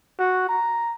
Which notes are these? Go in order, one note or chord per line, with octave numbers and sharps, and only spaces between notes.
F#4
A#5